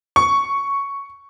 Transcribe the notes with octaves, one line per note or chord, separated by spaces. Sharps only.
C#6